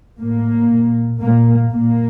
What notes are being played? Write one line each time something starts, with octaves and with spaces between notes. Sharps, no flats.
A2 A#3
A#2
A#2 A#3
A#2 A#3